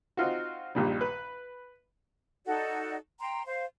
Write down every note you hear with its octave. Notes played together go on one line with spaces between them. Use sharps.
C4 D#4 F4 F#4
A#1 G2 A#2 D#3 G3
B4
D#4 F#4 A4 D5
G5 A#5 C6
C5 F5